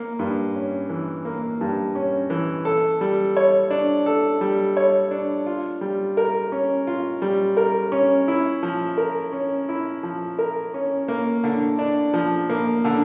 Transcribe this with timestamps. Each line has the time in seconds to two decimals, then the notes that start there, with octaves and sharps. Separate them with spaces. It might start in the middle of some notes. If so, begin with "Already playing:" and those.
Already playing: A#3
0.19 G2
0.55 C#4
0.90 E3
1.25 A#3
1.61 G2
1.95 C#4
2.30 E3
2.65 A4
3.01 G3
3.37 C#5
3.70 D4
4.06 A4
4.41 G3
4.77 C#5
5.11 D4
5.46 F4
5.81 G3
6.17 A#4
6.52 C#4
6.87 F4
7.22 G3
7.57 A#4
7.92 C#4
8.28 E4
8.63 F3
8.98 A#4
9.33 C#4
9.69 E4
10.03 F3
10.39 A#4
10.74 C#4
11.08 A#3
11.44 D3
11.79 D4
12.14 F3
12.50 A#3
12.85 D3